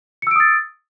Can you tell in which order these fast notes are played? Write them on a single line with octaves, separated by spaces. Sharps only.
C#7 E6 D7 D#6 A6